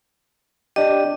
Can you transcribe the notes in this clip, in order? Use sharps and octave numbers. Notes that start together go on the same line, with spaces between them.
D4 G4 D#5